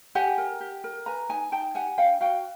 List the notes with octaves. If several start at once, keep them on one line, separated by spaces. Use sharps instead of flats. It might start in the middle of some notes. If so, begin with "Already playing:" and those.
G4 F#5 G#5
A#4
G4
A#4
B4 G#5 A#5
D#4 G#5 A#5
D#4 G5 A5
G4 F#5 G#5
D4 F5 G5
F#4 F5 G5